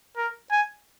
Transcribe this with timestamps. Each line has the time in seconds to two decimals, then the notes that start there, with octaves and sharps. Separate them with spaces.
0.17 A#4
0.51 G#5